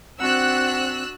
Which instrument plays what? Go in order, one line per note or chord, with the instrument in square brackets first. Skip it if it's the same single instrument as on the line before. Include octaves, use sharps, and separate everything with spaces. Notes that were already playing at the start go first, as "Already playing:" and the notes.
[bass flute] C4 [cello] D4 F#4 [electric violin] F#5 [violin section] E6 F#6